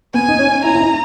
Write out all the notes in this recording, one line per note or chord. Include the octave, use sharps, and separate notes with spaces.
B3 G#5
D#4
C#4
E4 A#5
E4
D#4